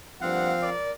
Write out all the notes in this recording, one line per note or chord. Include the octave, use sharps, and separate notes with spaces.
G2 F3 A#3 C4 F5 F#5
A#4 D5